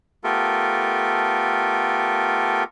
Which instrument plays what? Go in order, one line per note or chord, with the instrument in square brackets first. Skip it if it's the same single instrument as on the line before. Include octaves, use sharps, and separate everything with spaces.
[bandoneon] A3 B3 F4 G4 A4 A#4